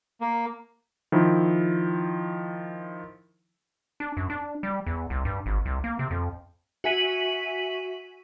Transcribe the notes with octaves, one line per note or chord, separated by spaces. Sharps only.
A#3
D#3 F3 E4
D4
F#2
D4
G3
E2
C2
G2
G#1
C2
A#3
C3
F2
F#4 E5 G#5 B6 D#7 F#7